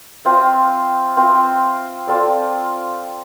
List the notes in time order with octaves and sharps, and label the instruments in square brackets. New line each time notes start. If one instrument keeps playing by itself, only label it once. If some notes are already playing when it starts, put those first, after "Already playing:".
[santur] C4 F4 C5 E5
C4 F4 C5 E5
C4 F4 A4 D5